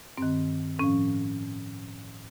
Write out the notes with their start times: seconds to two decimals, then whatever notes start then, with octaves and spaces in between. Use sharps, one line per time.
0.18 G2 D#3 C4
0.79 A2 F3 C#4